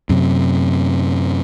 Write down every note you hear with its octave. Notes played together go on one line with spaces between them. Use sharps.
F#2 C3